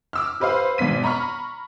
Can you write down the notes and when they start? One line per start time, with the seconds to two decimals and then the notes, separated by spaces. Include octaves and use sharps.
0.13 D6 E6 F6
0.40 G4 B4 C5 F5
0.78 G#1 B2 B6 D#7
1.04 A#5 B5 C#6 F6